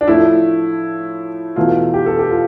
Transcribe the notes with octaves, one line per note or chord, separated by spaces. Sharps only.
D4
A2 F3 A3 E4
E2 B2 A3 F4
G4
A4
G4
F4